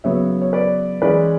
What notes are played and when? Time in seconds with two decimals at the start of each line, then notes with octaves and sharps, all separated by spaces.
0.04 C#3 F#3 B3 C#5 E5
0.41 C#5
0.53 B4 D5
1.02 E3 G#3 C#4 B4 D5